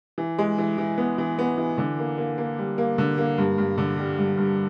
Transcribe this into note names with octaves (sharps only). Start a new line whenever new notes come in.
E3
G#3
E3
E3
B3
E3
B3
E3
D3
A#3
A#3
A#3
G3
A#3
D3
A#3
G2
G2
D3
G3
G2
G2